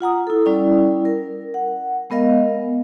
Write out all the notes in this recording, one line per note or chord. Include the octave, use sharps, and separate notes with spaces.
F4 F#5 A#5 D#6
E4 A4
G3 C#4 E4 D5
A#4
F#5
G#3 B3 A#4 D#5 F5